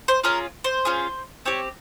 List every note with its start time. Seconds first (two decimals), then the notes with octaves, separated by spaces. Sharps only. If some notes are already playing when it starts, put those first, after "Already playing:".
0.08 C5
0.24 C#4 F4 G#4 A#4
0.64 C5
0.85 C#4 F4 G#4
1.45 C4 G4 C#5